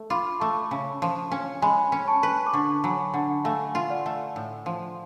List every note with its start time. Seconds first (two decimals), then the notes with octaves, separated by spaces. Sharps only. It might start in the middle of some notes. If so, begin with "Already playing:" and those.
Already playing: A3
0.10 F4 B5 D6
0.40 A3 A5 C#6
0.71 C#3
1.02 F3
1.32 C#4
1.62 G#3 G#5 B5
1.92 C#4
2.08 A5 C#6
2.23 B4
2.46 D6
2.53 D3 A5 C#6
2.83 F#3 G#5 B5
3.14 D3 F#5 A5
3.44 A3 F5 G#5
3.75 F4
3.90 D5 F#5
4.06 A3
4.36 A2
4.66 F3